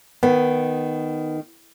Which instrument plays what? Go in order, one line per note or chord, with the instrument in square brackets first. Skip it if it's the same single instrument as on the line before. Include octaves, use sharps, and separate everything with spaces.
[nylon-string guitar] D#3 [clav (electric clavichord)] B3